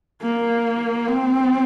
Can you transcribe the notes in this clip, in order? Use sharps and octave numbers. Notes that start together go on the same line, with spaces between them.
A#3
C4